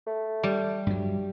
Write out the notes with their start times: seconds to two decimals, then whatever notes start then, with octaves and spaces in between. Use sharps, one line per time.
0.07 A3
0.43 G3
0.87 G2 F#3